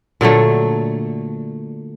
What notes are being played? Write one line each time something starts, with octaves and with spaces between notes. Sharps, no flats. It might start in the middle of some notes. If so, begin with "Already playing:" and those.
A#2 D3 F#3 A3